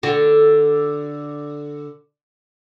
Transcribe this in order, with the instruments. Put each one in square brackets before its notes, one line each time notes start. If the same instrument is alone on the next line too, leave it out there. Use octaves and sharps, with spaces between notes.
[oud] D3 F#4